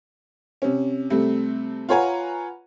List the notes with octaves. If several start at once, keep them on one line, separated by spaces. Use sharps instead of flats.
C3 C#4
C3 G3 A3 C4
F4 B4 C#5 F#5 G#5 A#5